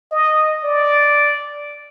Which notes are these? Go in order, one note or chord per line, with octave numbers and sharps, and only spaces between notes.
D#5
D5